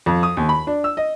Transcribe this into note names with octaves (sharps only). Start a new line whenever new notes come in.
F2
D#6
D#2
B5
D4
E6
D#5